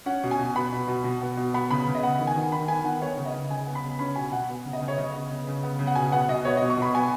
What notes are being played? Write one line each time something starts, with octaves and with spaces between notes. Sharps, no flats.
C#4 F#5
B2
G#5
B2
B3 B5
B2
B2
B2
B3
B2
B3 B5
C#3 B5
C#3
D#5
B3 F#5
D#3
G#5
D#3
D#3 B5
B3 G#5
D#3 F#5
B3 C#5
C#3
D#5
C#3
C#3 G#5
B3
B5
C#3
C#4 B5
B2 G#5
B2 F#5
B3
C#3
D#5
C#3
C#5
C#3 D#5
B3
C#3
C#3
B3
C#3
F#5
B2 G#5
B3 F#5
B2 D#5
B3 C#5
B2 D#5
C#6
B2 B5
B3 G#5